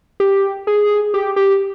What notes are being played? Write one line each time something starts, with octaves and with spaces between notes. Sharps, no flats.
G4
G#4
G4
G4